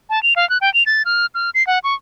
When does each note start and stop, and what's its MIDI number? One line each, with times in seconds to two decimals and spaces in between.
0.10 0.22 81
0.23 0.34 101
0.36 0.48 77
0.50 0.58 90
0.61 0.72 79
0.74 0.83 101
0.86 1.03 93
1.05 1.26 89
1.35 1.50 89
1.55 1.65 96
1.67 1.79 78
1.84 1.94 85